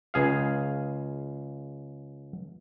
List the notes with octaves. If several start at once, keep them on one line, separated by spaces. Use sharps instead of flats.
C#2 G#4 F5